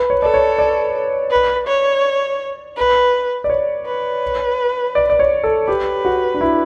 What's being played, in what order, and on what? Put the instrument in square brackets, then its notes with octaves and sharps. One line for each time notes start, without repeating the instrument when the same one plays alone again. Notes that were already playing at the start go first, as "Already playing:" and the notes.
Already playing: [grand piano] B4
C#5
[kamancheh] A4 [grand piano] D5
[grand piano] C#5
D5
[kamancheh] B4
C#5
B4
[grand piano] D5
C#5
[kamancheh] B4
[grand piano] D5
D5
C#5
A4
[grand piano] G4 [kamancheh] B4
[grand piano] F#4
D4
E4